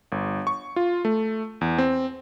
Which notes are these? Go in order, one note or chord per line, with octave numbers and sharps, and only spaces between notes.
G1
C#6
F4
A3
E2
C4